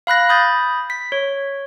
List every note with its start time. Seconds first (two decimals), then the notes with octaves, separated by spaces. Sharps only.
0.07 F5 B5 F#6 A#6
0.29 B5 D#6 G6 A6
0.90 B6
1.12 C#5